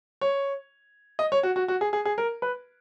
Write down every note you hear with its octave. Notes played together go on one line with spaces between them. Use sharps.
C#5
D#5
C#5
F#4
F#4
F#4
G#4
G#4
G#4
A#4
B4